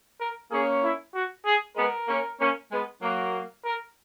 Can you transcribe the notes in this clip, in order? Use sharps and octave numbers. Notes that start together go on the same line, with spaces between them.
A#4
A#3 C#4 G#4
E4
F#4
G#4
G#3 B3 A#4
A#3 C#4
A#3 C#4
G#3 B3
F#3 A#3
A#4